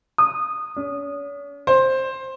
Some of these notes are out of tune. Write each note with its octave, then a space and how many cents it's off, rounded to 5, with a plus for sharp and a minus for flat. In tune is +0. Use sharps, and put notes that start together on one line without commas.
D#6 -15
C#4 +45
C5 +10